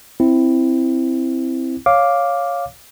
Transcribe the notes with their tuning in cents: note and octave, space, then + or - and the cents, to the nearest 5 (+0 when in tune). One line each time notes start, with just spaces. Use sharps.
C4 +0 E4 +0
C#5 +5 F5 +0 D6 +0